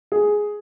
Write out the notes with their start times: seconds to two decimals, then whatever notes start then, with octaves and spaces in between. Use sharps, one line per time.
0.12 G#4